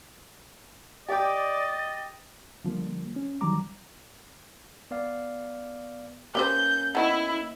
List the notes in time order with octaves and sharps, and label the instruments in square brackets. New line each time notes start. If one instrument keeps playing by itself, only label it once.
[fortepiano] G4 G5 [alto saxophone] D5 [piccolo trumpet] D#5 [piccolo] A6
[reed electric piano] D3 F3 G3 A#3
C#4
D#3 E3 F#3 G3 A#5 D6
[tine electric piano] B3 D5 F5
[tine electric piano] A#3 C#4 [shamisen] G4 B4 C5 [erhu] G6
[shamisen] D#3 B3 [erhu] E4